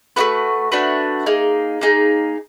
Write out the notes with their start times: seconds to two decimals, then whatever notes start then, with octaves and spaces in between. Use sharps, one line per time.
0.16 A3 D4 F#4 B4
0.72 A3 D4 F#4 B4
1.26 A#3 D#4 G#4
1.81 A#3 D#4 G#4